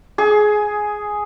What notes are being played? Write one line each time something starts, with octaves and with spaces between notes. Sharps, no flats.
G#4